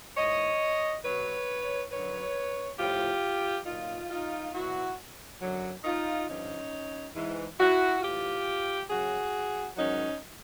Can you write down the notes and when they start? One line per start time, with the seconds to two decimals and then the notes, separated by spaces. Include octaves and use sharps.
0.17 G#2 E3 C#5 D#5
1.04 B2 F#3 B4 C#5
1.92 F#2 D3 F#3 B4 C#5
2.79 A2 F3 F4 G4
3.66 A#2 F#3 D#4 F4
4.10 D#4 F4
4.53 B2 F#3 E4 F#4
5.41 F#2 D3 F#3
5.84 D#4 F4
6.27 G2 D3 F3 C#4 D#4
7.15 G#2 E3
7.58 E4 F#4
8.02 A2 E3 F4 G4
8.89 F#2 C#3 F#3 F#4 G#4
9.77 G#2 D#3 F#3 C#4 D#4